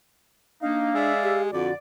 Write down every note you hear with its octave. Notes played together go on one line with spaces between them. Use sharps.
A#3 D4 D#4 F5
G#3 D5 E5
G4
F2 D3 F#4 D5